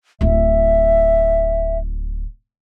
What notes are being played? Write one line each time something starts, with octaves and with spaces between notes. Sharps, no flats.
D1 E4 E5